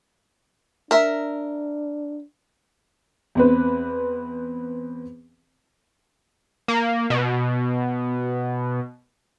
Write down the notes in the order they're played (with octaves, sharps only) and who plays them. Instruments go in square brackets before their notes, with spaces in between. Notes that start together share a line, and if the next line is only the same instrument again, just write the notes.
[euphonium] D4 [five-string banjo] A#4 E5
[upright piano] E2 C4 B4
[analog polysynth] A#3
B2